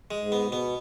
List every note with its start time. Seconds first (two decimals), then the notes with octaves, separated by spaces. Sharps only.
0.11 G#3
0.18 G#2
0.32 B3
0.46 B2
0.52 B3